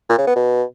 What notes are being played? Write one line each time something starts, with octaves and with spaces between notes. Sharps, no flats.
A#2
C#3
B3
B2